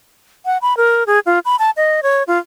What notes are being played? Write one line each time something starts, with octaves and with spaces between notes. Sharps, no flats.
F#5
B5
A#4
G#4
F4
B5
A5
D#5
C#5
F4